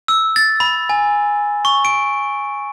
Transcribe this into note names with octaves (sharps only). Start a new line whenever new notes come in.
E6
A6
B5
G#5
C#6
D7